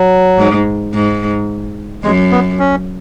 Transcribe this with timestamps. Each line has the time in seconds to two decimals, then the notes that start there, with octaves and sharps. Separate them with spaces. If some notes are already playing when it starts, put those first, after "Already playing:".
Already playing: F#3
0.38 G#2
0.94 G#2
2.03 F#2 G#3
2.32 B3
2.59 C#4